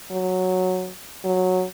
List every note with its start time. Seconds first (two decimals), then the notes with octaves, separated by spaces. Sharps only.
0.11 F#3
1.24 F#3